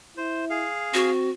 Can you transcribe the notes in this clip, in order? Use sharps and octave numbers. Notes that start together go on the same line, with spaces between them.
E4 C5
G#4 F5
C4 F#4